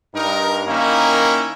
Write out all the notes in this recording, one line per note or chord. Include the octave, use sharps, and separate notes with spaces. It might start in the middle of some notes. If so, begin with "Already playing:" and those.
G2 D#4 A#4
D#3 A#3 C#4 D#4 E4 A#4